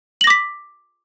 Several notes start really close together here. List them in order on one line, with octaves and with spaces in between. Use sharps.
F#7 A#6 D6 B6